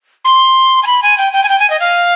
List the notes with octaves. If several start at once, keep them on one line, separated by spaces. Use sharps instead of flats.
C6
G#5
B5
G#5
G5
G5
G#5
G5
G#5
D#5
F5